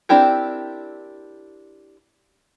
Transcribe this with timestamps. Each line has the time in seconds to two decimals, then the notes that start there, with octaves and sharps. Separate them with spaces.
0.09 C4 D4 E4 G4 A#4